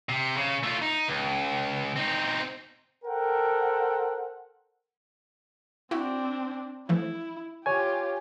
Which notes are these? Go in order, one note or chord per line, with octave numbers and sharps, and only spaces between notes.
C3
C#3
A3 F4
D#4
C#2
C4 D#4
A4 A#4 C5 F#5 G5
C4 D4 E4 F#4
E3 F3 A3 E4
F4 G4 C#5 G#5